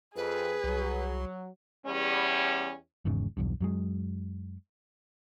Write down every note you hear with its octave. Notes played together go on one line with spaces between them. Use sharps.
F2 G#4 B4
C2 F#3
E2 G3 C#4
G#1 E2 G#2 C#3
B1 E2 G2
F#2 F#3 G#3